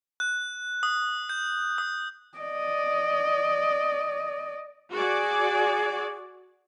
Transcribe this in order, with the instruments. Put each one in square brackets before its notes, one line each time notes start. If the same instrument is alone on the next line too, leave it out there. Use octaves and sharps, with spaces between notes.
[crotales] F#6
D#6
G6
D#6
[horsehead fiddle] D5 D#5
[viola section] F#4 D5 [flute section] G#4